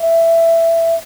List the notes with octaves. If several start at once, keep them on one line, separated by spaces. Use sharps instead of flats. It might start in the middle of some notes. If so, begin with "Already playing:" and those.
Already playing: E5